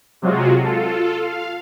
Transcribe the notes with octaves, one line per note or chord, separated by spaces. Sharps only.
C3 F#3 G#3 F4 F#4
F4 A4
F5